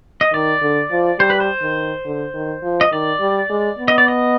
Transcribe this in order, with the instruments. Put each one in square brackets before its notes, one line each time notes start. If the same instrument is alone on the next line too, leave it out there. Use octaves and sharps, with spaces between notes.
[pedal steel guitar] D#5
[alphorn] D#3 [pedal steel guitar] D5
[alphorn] D3
F3
[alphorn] G3 [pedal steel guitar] C5
[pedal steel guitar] B4
C5
[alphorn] D#3
D3
D#3
F3
[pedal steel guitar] D#5
[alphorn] D#3 [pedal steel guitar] D5
[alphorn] G3
G#3
B3
[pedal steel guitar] D#5
D5
D#5